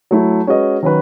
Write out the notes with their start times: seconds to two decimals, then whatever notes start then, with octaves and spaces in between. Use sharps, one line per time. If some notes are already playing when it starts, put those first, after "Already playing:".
0.11 F#3 A3 E4
0.47 G#3 C#4 F#4 B4 D#5
0.83 D#3 F#3 C#4 F#4 B4